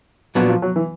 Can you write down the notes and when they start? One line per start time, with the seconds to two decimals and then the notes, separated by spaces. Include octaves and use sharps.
0.35 A#2 F3 F#3 B3 D4 F#4
0.49 F3
0.62 F#3
0.76 E3